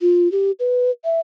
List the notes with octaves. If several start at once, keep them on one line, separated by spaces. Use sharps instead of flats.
F4
G4
B4
E5